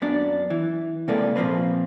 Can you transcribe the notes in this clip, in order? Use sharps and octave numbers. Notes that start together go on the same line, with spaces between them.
F#2 B3 D4 D5
E3
C3 G#3 A#3 A4 B4 D5
A#2 F3 A#3 C4 B4